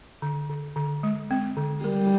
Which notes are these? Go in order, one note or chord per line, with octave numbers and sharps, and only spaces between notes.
D3
D3
D3
G#3
C4
D3
G3 A#4